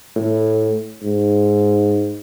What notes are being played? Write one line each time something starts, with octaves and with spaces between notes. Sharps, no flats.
A2
G#2